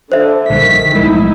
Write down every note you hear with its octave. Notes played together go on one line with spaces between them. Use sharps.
D3 C5 E5
A#1 D3 D#3 G3 B6
B1 A2 F3 G#3 D#4 E4